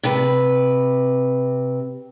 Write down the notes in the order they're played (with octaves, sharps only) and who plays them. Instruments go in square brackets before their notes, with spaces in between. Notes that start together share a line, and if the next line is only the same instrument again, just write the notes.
[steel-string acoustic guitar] C3 B4